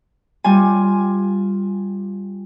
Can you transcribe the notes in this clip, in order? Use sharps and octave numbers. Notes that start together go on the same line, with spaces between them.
G3 F4 G#5